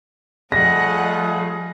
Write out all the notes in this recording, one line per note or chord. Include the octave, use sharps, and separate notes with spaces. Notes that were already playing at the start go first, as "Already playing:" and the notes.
F3 G3 A3 F4 G#4 D#5 F#5 A#6